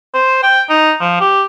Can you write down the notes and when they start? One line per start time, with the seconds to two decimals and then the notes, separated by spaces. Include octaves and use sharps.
0.14 C5
0.43 G5
0.69 D#4
1.00 F3
1.20 G4